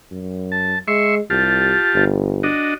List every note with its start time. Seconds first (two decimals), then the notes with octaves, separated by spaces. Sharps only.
0.11 F#2
0.52 A5
0.88 G#3 E5 C6 C#6
1.30 C2 F4 G4 A5
1.94 G1
2.43 D4 F#4 D#5